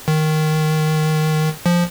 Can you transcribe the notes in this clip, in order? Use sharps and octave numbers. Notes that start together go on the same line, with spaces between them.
D#3
F3